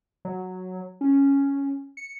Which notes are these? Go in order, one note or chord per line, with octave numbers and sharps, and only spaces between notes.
F#3
C#4
C#7